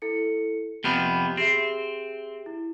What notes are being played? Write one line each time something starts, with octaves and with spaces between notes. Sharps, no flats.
E4 A4 C#7
F2 C3 B3 B5 F6 G6
C4 G4 G#4 E5
E4